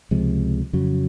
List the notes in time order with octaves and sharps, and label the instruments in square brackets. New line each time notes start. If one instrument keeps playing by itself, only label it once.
[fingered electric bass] C#2 C3 F3 G#3
F2 C#3 F#3